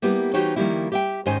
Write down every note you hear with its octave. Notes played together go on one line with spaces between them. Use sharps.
G3 A#3 B3 E4 G4
E3 D#4 F#4 G4 C5 C#5
D#3 F3 G3 A#3 E4
G4 E5 G5
G#2 D#3 C#4 D#4 C5 G#5